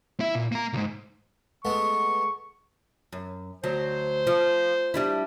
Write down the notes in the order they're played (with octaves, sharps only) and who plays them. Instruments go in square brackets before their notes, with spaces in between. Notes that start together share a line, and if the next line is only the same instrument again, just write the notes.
[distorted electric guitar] E4 E5
A#2
A#3 A#5
C#2 G#2
[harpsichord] G#3 A3 B3 [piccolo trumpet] C#6
[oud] F#2
[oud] D2 F#3 [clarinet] C5
[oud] F3
G3 D4 E4